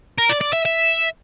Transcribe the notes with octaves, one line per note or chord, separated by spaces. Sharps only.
A#4
D5
D5
E5
E5